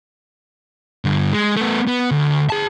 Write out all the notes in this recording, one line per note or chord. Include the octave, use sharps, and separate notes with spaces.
G2 D3
G#3
A3 B3
B3
D2
G#4 A5